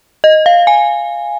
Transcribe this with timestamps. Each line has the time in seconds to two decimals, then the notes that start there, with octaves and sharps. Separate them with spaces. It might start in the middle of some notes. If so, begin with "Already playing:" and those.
0.24 D#5
0.46 F5
0.67 G#5